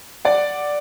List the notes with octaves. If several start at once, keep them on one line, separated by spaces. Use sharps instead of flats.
D5 F#5